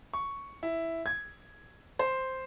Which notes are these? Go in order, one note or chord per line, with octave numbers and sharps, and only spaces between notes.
C#6
E4
G#6
C5